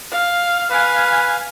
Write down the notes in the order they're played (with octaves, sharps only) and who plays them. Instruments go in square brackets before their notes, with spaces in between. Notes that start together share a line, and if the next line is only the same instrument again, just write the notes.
[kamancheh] F5
[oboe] B4 [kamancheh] F5 G#5